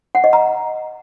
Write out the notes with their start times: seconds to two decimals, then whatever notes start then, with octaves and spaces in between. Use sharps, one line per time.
0.15 F#5
0.24 D#5
0.33 A#5